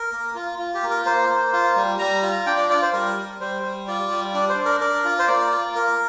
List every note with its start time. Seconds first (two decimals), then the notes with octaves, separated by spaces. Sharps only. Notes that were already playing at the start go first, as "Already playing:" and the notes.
Already playing: A#4
0.12 A#3
0.35 F4
0.59 F4
0.74 G4
0.83 A#3
0.90 A#4
1.05 A#3 C5
1.29 A#3
1.53 F4
1.76 G3
1.99 G3 A#5
2.22 F4
2.46 D4 G5
2.58 D5
2.69 F4 D5
2.82 C5
2.93 G3 A#4
3.17 G3
3.40 G3 C5
3.63 G3
3.88 F4 D5
4.11 G3
4.34 D4 D5
4.49 C5
4.58 D4
4.65 A#4
4.81 D4 A#4
5.04 F4
5.19 C5
5.28 A#3 D5
5.51 F4
5.75 A#3 A#4